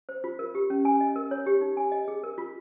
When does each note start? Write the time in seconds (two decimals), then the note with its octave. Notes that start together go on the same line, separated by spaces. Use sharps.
0.09 C5
0.24 F4
0.39 A#4
0.55 G4
0.70 C#4
0.85 G#5
1.01 D#5
1.16 A#4
1.31 C#5
1.46 G4
1.61 D#4
1.77 G#5
1.92 D#5
2.08 G#4
2.24 A#4
2.38 F4